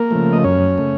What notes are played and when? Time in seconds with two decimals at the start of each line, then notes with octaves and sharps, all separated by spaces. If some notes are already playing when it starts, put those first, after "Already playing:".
Already playing: A#3 A#4
0.11 C#3 F3 A3
0.33 D#5
0.44 F#2 C#4 C#5
0.78 C#3 A3